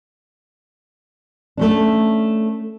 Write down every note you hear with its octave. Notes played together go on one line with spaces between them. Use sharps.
A3 C#4 D4